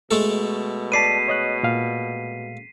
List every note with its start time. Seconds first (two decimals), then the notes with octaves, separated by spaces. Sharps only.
0.11 B2 G#3 A3 A4
0.92 B4 D5 A5 B6 C7 D#7
1.28 C#5 D#5 F#6
1.63 A#2 F5